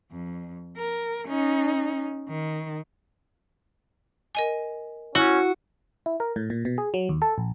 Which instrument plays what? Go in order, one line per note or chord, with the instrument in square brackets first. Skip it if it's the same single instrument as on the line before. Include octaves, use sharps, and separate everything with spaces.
[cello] F2
A#4
C#4 D#4
D#3
[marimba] A#4 D#5 G#5
[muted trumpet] C#4 [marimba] E4 [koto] F#4
[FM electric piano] E4
A#4
A2
A#2
B2
G#4
F#3
D#2
A4
A#1